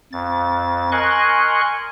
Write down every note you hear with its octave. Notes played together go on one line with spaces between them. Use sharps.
F2 A6
A#4 D#5 G#5 C6 C#6 F#6